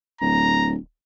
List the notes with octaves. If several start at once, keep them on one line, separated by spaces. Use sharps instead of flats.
D1 A#5